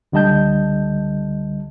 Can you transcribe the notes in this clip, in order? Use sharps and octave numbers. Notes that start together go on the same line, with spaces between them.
C#2 D3 G3 D#5 A5 G6